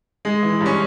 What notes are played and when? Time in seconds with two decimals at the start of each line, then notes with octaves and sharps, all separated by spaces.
0.25 G#3
0.43 E3
0.61 G2
0.66 C#4